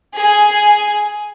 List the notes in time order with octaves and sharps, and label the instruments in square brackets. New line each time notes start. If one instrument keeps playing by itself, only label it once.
[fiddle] G#4 G#5